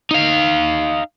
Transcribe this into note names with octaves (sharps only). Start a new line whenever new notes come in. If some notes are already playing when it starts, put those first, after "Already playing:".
D#4 F5